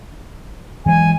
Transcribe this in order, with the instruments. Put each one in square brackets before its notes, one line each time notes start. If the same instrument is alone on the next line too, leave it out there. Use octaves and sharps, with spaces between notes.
[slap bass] E3 F#3 G#3 [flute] G#5